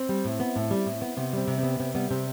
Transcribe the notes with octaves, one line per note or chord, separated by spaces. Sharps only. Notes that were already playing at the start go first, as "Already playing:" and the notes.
Already playing: C4
G3
A2
B3
A2
G3
A2
B3
C3 B3
G3 C4
C3
B3 C4
C3 C4
G3 B3
C3 C4